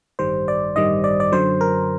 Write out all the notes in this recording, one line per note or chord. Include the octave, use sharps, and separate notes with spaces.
A1 G2 D#3 G3 C5
D5
A1 G2 D#3 G3 D#5
D5
D5
F#2 D3 F#3 C5
A#4